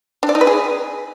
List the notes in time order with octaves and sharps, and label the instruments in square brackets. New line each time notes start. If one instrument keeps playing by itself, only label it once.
[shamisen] D4
D5
D#4
B4
G#4